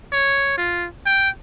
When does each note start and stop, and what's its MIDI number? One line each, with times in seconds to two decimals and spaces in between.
0.12 0.57 73
0.58 0.87 65
1.06 1.29 79